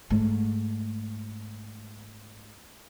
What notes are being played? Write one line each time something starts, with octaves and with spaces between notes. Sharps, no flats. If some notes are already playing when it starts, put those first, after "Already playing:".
G#2 A3